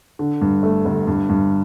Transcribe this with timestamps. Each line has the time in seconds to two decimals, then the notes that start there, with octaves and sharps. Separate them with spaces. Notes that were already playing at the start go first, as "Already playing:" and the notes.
0.19 D3
0.41 G2
0.63 A3
0.85 G1
1.07 G2
1.29 G2